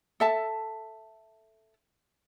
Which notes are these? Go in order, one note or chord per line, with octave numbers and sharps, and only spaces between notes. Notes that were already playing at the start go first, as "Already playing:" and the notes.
A4 E5 A5